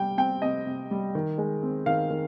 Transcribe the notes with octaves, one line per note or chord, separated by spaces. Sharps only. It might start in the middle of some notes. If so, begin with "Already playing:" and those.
Already playing: C3 G3 G5
C4 G5
C3 D#5
C3
G3
D#3
G#3
C4
D#3 F5
D#3